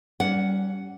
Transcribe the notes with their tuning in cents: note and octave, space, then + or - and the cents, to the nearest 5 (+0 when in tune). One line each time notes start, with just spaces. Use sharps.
G3 -20 C#4 +20 F#5 +0